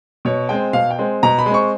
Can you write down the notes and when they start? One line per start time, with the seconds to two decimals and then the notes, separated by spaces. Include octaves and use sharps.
0.25 B2 C#5
0.49 G#3 C4 G5
0.73 B2 F5
0.91 G5
0.99 G#3 C4
1.23 B2 A#5
1.39 B5
1.46 G#3
1.51 C4 C#6